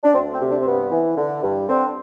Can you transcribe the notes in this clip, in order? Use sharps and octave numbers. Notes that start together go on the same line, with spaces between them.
D4
D2 C4
C4
C3
D4
C4
G2 B3
E3
D3
G2
D3 C4